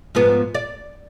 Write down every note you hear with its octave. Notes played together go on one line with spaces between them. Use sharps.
G#2 F3 B3
D5